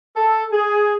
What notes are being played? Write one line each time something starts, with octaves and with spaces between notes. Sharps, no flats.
A4
G#4